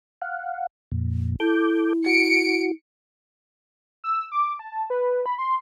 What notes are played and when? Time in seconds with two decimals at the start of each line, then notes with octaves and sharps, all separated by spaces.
0.22 F5 F#5
0.92 F2 A#2
1.40 E4 A4 D6 G6
2.06 F#4 C#7 D7
4.04 E6
4.32 D6
4.59 A5
4.90 B4
5.26 B5
5.38 C6